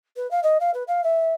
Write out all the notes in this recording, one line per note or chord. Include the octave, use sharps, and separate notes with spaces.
B4
F5
D#5
F5
B4
F5
E5